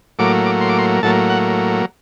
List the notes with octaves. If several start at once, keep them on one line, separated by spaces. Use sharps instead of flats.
A2 F#3 A#3 D6
D6
C6
D6
C6
A2 F#3 A#3 A5
F#5